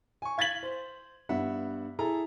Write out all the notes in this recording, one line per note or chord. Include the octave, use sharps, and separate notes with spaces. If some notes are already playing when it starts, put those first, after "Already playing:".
G#5 C#6
F5 G#6 A6 B6 F#7
C5
G2 B3 E5 F#5
E4 G#4 A4 A#5